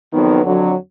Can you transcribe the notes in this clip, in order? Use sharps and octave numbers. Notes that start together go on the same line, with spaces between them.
F2 D#3 F#3 B3
F2 D3 F#3